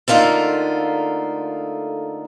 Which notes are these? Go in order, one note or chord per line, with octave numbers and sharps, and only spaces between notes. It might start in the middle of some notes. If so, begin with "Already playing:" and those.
D3 A3 A#3 D#4 F4